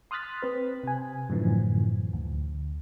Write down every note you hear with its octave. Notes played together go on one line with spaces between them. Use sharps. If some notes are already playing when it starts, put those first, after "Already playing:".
C6 D#6 F6 F#6 A6 B6
C4 B4
C3 G#5
F#2 A2 D3 E3 F3
D2